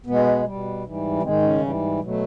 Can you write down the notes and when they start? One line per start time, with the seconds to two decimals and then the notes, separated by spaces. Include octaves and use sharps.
0.06 B2 G#3 B3
0.45 B2 G3
0.84 G#2 E3 G3
1.23 G#2 C3 D#3 G#3 C4
1.42 C#3 C#4
1.61 G#2 E3 G3
2.00 B2 F#3 A3